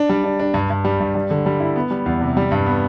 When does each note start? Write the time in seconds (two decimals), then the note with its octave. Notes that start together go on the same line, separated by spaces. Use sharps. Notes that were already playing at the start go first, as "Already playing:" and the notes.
Already playing: D4
0.10 G3
0.24 D4
0.40 D4
0.54 G2
0.70 G2
0.85 G3
1.00 G2
1.15 G3
1.31 D3
1.46 G3
1.60 E4
1.76 B3
1.91 G3
2.06 E2
2.21 C3
2.37 G3
2.52 G2
2.66 B3